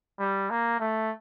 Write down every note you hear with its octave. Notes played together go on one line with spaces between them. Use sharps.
G3
A#3
A3